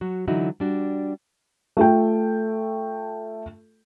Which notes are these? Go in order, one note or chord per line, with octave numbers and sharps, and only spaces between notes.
F#3 F#4
D3 E3 F#3 D#4 E4 F#4
G3 D4 F#4
A3 F4 A4 G5